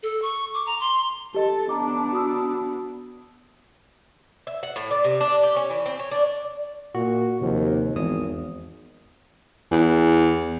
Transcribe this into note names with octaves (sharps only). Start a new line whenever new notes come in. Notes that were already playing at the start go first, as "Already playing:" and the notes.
A4
C#6
D6
A#5
C6
G4 A4 D#5
B3 D4 A5 A#5 D6
F#4 D#6 E6
E5
F#5
A2
D5
C3
D4
G4
C#4
E3
C4
C#5
D4
A#2 F#4
D#2 C3 F3
G#1 E2 D#6
E2